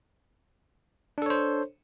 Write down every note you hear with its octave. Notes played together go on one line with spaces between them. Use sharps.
D4 A4 C5 C#5